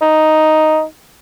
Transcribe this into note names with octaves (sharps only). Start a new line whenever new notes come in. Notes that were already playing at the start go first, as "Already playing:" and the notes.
D#4